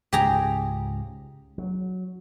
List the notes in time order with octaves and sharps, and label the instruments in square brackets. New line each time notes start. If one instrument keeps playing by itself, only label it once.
[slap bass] C#2 G#2 [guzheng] G4 G#4 A#5
[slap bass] F#3